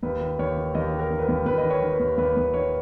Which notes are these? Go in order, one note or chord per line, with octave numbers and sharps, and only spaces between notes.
D#2 B4
D#3
D#2 C#5
D#3
D#2 D#5
D#3
A#4
D#2
B4
A#4
D#2
D#2 B4
D#5
D#3
C#5
D#3
B4
D#2
D#2 B4
D#2
D#3 C#5